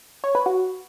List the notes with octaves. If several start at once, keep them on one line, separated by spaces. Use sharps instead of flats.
C#5
B4
F#4